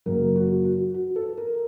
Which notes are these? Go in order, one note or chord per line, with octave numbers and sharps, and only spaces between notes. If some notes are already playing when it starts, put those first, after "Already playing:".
F#2 C#3 F#3 A#3 A#4
F#4
F#4
F#4
A4
A#4